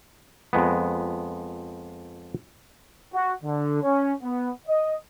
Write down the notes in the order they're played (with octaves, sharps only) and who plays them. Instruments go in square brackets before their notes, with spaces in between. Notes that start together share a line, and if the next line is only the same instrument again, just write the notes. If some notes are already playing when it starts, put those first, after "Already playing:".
[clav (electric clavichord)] F2 G#3 B3
[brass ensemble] F#4
D3
C#4
B3
D#5